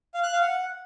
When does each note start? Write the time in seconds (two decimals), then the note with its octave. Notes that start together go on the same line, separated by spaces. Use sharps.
0.14 F5
0.23 F#6
0.33 F5
0.42 F#5